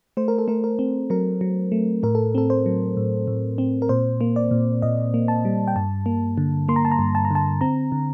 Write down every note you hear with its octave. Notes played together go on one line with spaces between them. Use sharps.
A3 C5
A#4
A4
A3 A#4
A#4
C4
F#3 A#4
F#3
A3
A2 A#4
A4
C4 A4
C5
F#3
A2
A2
C4
A#4
A#2 C5
A#3
D5
A#2
A#2 D#5
A#3
A5
G3
G5
G2 A5
A#3
D3
A#3 C6
A#5
A5
A#5
G2
A5
A#5
D3 A5
C4 A#5
D3